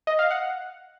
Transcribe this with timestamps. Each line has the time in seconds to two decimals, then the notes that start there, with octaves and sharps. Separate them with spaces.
0.07 D#5
0.19 F5
0.30 F#5